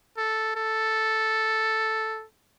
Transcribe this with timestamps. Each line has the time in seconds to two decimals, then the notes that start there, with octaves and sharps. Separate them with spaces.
0.17 A4
0.55 A4